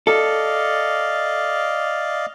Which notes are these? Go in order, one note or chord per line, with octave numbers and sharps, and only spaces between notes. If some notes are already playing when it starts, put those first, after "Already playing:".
A4 D5 D#5 F5